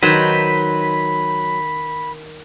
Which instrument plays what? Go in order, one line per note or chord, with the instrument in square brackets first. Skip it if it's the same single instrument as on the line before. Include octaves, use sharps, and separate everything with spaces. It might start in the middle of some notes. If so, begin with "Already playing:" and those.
[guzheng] D#3 [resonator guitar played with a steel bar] F#3 [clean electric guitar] B4 C5 [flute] B5